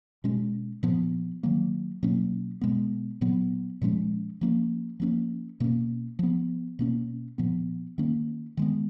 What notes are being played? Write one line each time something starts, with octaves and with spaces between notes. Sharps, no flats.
B2 G#3 C#4
A#2 F3 B3
D#3 F#3 A#3
B2 F#3 A#3 C#4
B2 G#3 B3
A#2 F#3 B3
A#2 F3 G#3 C#4
F3 A#3 C#4
F3 A#3 C#4
B2 A#3 C#4
F3 B3
B2 A#3 C#4
A#2 F3 B3
D#3 A#3 C#4
D#3 G#3 B3